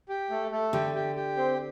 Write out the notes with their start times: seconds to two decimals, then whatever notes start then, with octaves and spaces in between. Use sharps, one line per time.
0.09 G4
0.30 A3
0.51 A3
0.73 D3 G4
0.95 G4
1.16 G4
1.37 C4